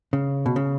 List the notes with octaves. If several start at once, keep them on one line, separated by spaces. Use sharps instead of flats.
C#3
B2
C#3